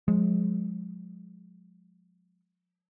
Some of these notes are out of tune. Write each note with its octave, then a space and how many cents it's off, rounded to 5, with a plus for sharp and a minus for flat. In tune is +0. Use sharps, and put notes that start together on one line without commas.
F3 +45 G#3 +5